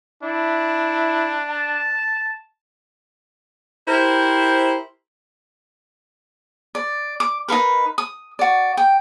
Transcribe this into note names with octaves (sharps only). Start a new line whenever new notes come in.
D4 E4
A5
E4 G4 A#4 C5
D5
D6
D#4 F4 A#4 B4
D#6
F#4 D5
G5